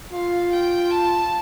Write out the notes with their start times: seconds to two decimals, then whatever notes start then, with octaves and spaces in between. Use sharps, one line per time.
0.13 F4 F5
0.52 G5
0.90 A5